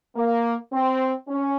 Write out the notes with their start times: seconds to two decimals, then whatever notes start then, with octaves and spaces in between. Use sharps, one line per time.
0.16 A#3
0.72 C4
1.28 C#4